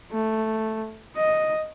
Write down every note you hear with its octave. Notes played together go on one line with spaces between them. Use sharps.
A3
D#5